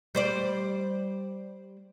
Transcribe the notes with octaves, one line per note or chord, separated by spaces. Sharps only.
G3 C5 D5